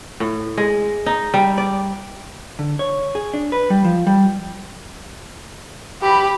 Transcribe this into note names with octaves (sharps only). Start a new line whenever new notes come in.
A2
G#3
D#4
G3
D5
D3
C#5
G#4
D4
B4
G3
F3
G3
F#2 E3 G4 B5